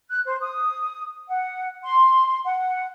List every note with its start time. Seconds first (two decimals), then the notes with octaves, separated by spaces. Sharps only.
0.10 F#6
0.26 C5
0.41 D#6
1.29 F#5
1.84 C6
2.45 F#5